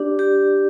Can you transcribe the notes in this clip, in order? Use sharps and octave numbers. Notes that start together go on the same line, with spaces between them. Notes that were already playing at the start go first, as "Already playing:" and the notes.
Already playing: D4 G4 D5
G4